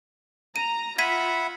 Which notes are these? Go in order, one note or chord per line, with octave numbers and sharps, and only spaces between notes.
A#5 D#7
F4 E5 F#5 B5 G#6 B6 D#7